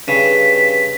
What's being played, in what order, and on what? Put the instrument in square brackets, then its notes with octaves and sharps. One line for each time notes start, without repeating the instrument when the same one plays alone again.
[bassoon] G2 [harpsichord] C#3 [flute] B6